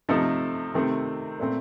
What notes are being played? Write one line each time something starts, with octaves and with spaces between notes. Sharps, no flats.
C3 F3 A3 D#4 A4
C3 D#3 A3 C4
A#2 A3 C4